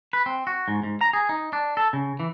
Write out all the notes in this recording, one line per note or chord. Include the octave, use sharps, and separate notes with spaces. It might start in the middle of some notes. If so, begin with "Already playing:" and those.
B4
C4
F#4
G#2
G#2
A#5
G#4
D#4
D4
A4
C#3
E3